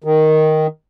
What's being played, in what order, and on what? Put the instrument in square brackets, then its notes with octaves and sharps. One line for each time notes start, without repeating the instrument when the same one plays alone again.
[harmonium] D#3